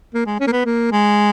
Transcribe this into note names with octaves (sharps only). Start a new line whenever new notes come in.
A#3
G#3
C#4
A#3
B3
A#3
G#3